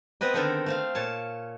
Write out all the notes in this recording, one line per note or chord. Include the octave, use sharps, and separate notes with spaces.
B3 C4 B4 D#5
D3 D#3 B3 C4 A4 A#4
A3 C4 F5
A#2 C#5 A5